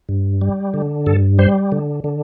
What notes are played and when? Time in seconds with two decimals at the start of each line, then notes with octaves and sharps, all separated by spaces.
0.09 G2
0.41 G3
0.74 D3
1.06 G2 A4
1.39 G3 C5
1.72 D3
2.04 D3